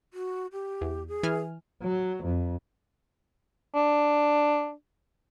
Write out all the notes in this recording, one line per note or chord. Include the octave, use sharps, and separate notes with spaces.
F#4
G4
E2
G#4
E3 G#5 F6
F#3
F2
D4